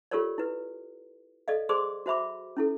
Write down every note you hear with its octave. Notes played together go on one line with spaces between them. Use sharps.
F4 G4 A4 A#4 C#5 D5
E4 B4
A4 D5 D#5 F5
G#4 C5 D5 C6 D6 D#6
F#4 C5 E5 B5 D6
C#4 E4 A4